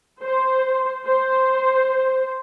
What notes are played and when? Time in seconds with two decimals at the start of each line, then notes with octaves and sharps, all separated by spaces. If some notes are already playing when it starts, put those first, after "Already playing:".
0.22 C5
1.06 C5